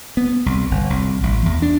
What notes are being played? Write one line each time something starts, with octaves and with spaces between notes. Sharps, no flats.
B3
C2
G1
C2
A1
E2
D4